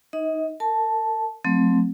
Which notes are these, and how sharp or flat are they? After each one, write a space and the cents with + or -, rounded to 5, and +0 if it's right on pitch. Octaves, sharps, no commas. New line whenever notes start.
D#4 +0 D#5 +40
A#4 -40 A5 -10
F#3 -45 A3 +0 C4 +0